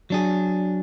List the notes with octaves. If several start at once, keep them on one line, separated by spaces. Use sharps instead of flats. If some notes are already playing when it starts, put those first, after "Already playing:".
F#3 D4 G#4